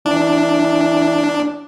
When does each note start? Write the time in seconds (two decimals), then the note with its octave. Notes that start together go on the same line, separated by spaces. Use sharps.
0.06 E3 D4